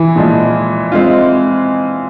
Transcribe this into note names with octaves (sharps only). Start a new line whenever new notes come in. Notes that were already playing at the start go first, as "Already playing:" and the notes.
Already playing: E3
A#2 F3 G#3
G#3 C4 F4